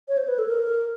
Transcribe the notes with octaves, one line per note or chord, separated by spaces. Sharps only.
C#5
C5
B4
A4
A#4